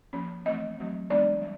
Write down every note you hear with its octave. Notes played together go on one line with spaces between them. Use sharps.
F3 A#3 C#4
E3 A3 C4 D#5
F#3 A3 C4
E3 G#3 B3 D4 D5
G3